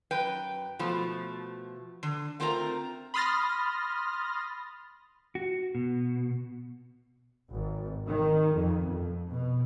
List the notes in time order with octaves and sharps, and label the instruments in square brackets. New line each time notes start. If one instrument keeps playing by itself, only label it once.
[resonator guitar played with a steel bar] F#2 B4 G5
B2 F3 A3
D3
A3 C4 F4 A#4 F#5 A#5
[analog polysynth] B5 C6 D#6 F6 A6 A#6
[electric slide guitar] F#4
B2
[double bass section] G#1
D#3
F2
F2
B2